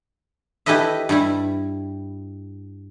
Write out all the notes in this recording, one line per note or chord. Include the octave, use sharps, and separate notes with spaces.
E4 G4 A4 B4 D#5 E5
G2 G3 E4